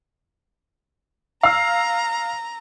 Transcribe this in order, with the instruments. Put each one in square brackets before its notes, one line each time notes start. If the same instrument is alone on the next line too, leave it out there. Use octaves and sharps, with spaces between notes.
[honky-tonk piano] F5 E6 [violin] A#5